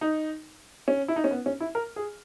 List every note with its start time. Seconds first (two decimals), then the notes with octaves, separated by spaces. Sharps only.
0.01 D#4
0.88 C#4
1.08 E4
1.16 D#4
1.24 C#4
1.31 B3
1.46 C#4
1.60 E4
1.75 A#4
1.96 G#4